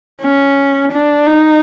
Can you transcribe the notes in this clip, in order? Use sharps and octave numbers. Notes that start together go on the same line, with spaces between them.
C#4
D4
D#4